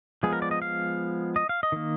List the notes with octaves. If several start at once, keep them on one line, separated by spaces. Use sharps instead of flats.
F3 G#3 B3 G#4
A#4
D5
D#5
F5
D#5
F5
D#5
D#3 A#3